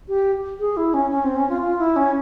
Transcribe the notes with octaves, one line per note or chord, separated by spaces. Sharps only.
G4
G#4
E4
C#4
C#4
C4
C#4
F4
F4
E4
C#4